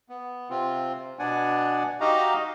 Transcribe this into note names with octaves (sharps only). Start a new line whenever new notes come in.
B3
C3 C4 F4
B2 B3 D4 D5 F#5 G#5
D#4 F#4 G4 D#5 F5 A#5